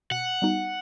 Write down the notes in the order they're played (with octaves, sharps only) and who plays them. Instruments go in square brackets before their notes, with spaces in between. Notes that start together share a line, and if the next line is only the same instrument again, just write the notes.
[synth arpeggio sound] B2 [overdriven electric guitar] F#5
[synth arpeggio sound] G3 B3 D#4 F#4